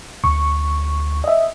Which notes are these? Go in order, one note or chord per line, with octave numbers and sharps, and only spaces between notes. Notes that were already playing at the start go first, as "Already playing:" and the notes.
D2 C#6
D#5 E5